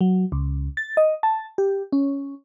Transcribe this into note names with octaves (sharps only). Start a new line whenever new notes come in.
F#3
C#2
A6
D#5
A5
G4
C#4